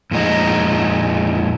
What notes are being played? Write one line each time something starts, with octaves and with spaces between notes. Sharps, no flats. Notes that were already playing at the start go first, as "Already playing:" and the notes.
F2 A#2 G#3 D#4